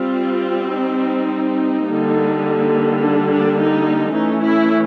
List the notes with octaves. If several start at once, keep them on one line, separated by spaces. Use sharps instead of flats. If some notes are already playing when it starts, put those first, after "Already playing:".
Already playing: G3 C4 F4
D#4
D3 G3 A#3
D4
D4
D#4
E3 A3 C#4 D#4
E4